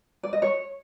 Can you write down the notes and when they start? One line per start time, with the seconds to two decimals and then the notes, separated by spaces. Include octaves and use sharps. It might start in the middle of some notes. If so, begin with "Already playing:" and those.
0.23 D5
0.33 D#5
0.42 C#5